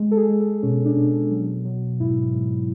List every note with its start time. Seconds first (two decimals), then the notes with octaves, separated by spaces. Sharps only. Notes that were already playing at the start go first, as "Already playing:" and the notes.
Already playing: G#3
0.11 A4
0.17 G#4
0.29 G#3
0.40 A4
0.63 B2 C#4
0.85 D4
0.97 B2
1.31 F#3
1.65 F#3
2.00 G#2 E4
2.34 G#2